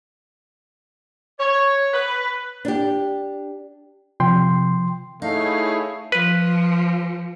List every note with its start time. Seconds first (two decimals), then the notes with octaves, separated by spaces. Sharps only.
1.40 C#5
1.94 B4
2.65 D4 G4
4.20 C3 F3 G5 C6
5.22 A3 D#4 E4 G#4 C#5 F5
6.12 F3 B4